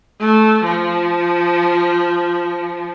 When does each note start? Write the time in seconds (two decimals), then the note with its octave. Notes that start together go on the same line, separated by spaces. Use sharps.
0.20 A3
0.64 F3